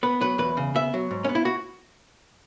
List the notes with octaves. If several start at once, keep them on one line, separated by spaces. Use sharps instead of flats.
B3 B4
F#3 B4
E2 B4
C#3
B3 E5
F#3
G#2
C#4
B3
E4
F#4